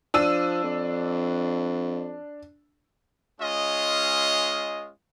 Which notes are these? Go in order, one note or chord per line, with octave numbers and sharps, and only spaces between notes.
F3 D4 E6 D#7
F2
G#3 C#4 F4 D#5